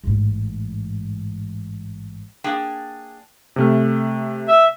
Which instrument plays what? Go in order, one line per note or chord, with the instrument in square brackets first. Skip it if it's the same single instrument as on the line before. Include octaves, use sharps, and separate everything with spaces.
[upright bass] A1 G#2
[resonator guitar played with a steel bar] A#3 D4 G#4 G5
[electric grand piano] C3 A3 F6
[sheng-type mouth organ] E5